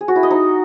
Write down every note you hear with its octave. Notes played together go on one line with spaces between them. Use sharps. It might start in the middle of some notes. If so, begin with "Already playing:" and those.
G#4
F#4
E4
D#5
D#4